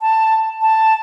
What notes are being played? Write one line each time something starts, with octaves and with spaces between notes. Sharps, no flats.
A5
A5